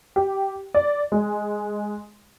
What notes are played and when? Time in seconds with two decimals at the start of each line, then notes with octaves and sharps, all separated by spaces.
0.16 G4
0.74 D5
1.12 G#3